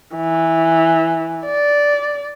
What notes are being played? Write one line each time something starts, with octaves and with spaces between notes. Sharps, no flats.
E3
D5